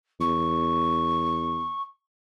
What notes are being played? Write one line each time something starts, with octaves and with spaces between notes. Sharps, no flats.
E2 C#6